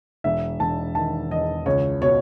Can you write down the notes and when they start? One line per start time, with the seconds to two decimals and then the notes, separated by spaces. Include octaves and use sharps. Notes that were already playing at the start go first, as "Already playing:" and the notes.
0.24 E1 E5
0.60 E1 A5
0.95 D#3 A5
1.30 E2 D#5
1.66 C#2 C#5
2.02 B2 C#5